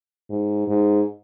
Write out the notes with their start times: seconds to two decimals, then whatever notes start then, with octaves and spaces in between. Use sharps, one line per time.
0.30 G#2
0.68 G#2